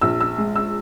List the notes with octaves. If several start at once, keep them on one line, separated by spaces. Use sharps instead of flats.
A#1 E6
E6
G#3
E6